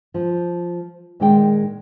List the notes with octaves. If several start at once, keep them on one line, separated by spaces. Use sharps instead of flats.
F3
A#2 D#3 G#3 D#4 G5